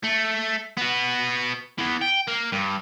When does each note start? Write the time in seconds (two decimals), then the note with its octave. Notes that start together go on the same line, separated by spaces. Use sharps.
0.04 A3
0.78 B3 F#4
1.79 E3 B3
2.02 G5
2.28 A#3
2.52 G2